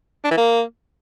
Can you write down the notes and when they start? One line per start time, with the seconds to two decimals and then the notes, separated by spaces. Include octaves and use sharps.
0.24 D4
0.31 E3
0.37 A#3